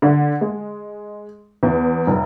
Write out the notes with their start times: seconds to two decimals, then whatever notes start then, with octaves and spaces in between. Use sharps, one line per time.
0.02 D3
0.41 G#3
1.63 E2
2.07 F1